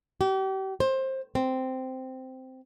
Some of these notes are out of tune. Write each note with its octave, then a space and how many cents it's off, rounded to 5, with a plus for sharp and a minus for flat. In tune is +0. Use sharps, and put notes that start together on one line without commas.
G4 -35
C5 +20
C4 -10